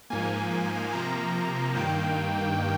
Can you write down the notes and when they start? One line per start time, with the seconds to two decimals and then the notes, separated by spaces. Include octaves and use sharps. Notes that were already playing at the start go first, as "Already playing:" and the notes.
0.10 G#2 F3 A#3 G#5
0.92 C3 F3 A#3 A#5
1.75 G2 D#3 A#3 G5